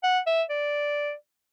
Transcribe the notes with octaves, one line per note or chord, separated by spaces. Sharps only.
F#5
E5
D5